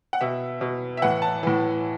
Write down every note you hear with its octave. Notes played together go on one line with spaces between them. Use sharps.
F#5
B2 E5
B2
E5
A2 E3 F#5
A5
A2 E3